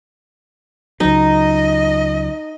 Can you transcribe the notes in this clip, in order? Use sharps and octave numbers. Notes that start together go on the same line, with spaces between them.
C#2 F#3 D#4 D#5